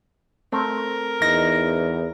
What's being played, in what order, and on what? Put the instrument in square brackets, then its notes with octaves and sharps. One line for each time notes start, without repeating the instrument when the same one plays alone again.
[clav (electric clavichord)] A3 C4 [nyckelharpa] A#4
[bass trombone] E2 [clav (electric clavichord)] D#4 [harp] A#6